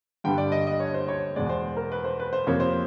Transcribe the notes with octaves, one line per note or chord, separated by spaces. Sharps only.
G2 D3 G3 B3 G5
D5
D#5
D#5
C#5
C5
C#5
E2 B2 G#3 D5
C5
A#4
B4
C5
B4
C5
F2 C3 F3 A#3 C#5
C5